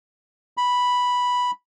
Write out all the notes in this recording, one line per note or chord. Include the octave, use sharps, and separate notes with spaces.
B5